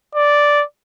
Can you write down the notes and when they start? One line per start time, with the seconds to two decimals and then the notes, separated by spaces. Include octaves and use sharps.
0.15 D5